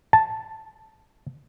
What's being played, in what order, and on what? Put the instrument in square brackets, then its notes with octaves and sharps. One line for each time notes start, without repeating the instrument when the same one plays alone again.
[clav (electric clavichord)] A5